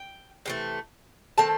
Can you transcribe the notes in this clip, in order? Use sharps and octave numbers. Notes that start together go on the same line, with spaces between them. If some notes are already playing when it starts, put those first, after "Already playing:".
Already playing: G5
C3 E3 A3
D#3 A3 C4 A5